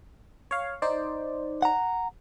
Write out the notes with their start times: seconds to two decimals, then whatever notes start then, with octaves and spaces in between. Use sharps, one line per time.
0.51 C#5 F5
0.82 D#4 C5 D5
1.62 F#5 A#5